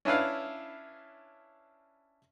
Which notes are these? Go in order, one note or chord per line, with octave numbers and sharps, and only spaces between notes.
C#4 D4 E4 B4 F5